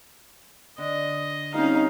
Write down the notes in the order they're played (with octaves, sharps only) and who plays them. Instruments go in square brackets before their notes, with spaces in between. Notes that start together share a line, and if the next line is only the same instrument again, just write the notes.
[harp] D3 [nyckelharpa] D#5
[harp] G3 C4 [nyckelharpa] C#4 F5 [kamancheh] D#4